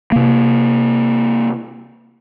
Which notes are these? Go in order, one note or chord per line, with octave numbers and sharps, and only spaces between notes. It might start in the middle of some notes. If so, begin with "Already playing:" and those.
C3 A#3